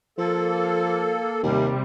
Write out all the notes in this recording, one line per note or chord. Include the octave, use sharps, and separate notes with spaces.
F3 A#3 A4
D#2 C3 G3